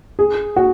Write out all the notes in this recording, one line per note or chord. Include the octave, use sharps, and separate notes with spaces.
G#4
F#4